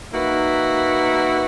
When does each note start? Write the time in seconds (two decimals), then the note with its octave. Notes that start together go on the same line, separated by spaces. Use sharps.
0.13 A#3 D#4 F#4 B4 E5